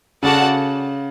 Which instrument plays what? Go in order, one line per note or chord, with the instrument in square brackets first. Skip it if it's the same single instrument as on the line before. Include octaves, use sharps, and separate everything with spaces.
[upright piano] C#3 [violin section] F#4 A4 D5 F#5 A5